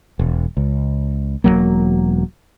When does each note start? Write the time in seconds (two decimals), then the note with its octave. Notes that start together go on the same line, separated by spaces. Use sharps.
0.19 E1
0.57 C#2
1.44 E1 F2 F#3 A#3